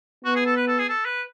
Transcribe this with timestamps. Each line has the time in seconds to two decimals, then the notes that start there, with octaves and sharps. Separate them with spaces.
0.25 B3 F#4
0.35 G#4
0.45 A4
0.56 B4
0.67 A4
0.78 G#4
0.89 A4
1.05 B4